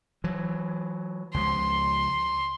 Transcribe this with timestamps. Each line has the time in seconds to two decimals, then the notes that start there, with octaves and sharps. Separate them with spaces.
0.24 E3 F#3
1.34 C#2 F3 C6